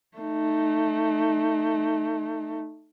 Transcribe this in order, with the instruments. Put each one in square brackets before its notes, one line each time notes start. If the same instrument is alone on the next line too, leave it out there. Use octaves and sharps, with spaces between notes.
[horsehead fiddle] A3 D#4